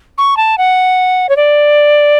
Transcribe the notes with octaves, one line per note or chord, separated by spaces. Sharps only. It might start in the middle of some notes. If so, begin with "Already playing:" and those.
C#6
A5
F#5
C#5
D5